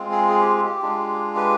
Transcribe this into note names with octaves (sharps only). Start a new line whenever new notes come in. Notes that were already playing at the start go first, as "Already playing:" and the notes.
Already playing: G#3 C4 F4
G#4
G#4
G4
G4
G#3 D4 F4
G4 B4